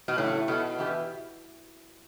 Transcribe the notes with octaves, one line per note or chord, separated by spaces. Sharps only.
B2
A2 C#3 F#3 A3 D4 G4
B2 B3 E4 A4
E3 B3 E4 G4 B4